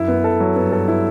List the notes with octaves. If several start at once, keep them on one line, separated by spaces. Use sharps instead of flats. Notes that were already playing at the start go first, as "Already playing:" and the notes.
Already playing: F#2 E4
B3
A4
F#3
G2 B3
A4
E4